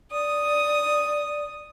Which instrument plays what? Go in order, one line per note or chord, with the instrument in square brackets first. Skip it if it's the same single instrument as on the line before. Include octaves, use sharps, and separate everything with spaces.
[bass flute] D5 [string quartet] D#6